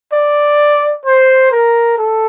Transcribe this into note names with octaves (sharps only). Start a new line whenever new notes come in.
D5
C5
A#4
A4